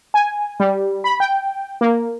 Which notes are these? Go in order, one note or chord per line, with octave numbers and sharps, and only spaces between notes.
G#5
G3
B5
G5
A#3